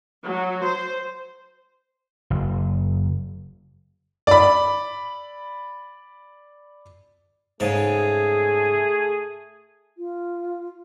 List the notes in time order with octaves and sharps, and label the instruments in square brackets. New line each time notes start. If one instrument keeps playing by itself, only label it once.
[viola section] F#3
C5
[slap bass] F#1
[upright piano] D5 B5
[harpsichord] G#2 C#3 A5 [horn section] A3 G#4
[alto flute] F4